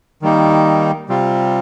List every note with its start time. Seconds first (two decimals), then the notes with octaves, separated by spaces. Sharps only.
0.22 D#3 G3 A#3 D#4
1.09 C3 G3 C4 F4